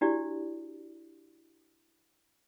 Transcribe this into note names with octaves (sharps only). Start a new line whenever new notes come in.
D4 E4 F#4 G4 D5